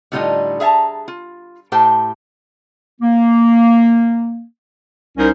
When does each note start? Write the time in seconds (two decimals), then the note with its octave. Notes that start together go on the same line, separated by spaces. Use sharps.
0.12 A2 D3 G3 D#4 F4 D#5
0.60 G#4 E5 F5 A5 A#5
1.08 F4
1.72 A2 G4 C5 G5 A5
3.01 A#3
5.18 C2 C#4 D#4 A#4 C5